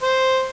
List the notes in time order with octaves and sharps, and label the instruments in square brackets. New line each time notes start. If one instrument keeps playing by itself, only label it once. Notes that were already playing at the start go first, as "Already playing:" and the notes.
[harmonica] C5